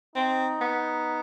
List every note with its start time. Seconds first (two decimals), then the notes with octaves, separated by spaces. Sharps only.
0.15 C4 D#4
0.61 B3